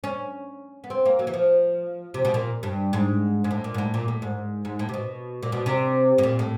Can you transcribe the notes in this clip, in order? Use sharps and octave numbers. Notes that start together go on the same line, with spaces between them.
C#4
B3
C4
A#3
F#3
E3
F3
C3
B2
A#2
G2
G#2
G#2
A2
A#2
G#2
A2
A#2
A2
G#2
G#2
A2
C3
B2
A#2
B2
C3
A2
A#2
A2